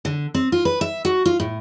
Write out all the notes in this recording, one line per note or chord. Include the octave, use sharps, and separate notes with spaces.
D3
C4
F4
B4
E5
F#4
F4
A2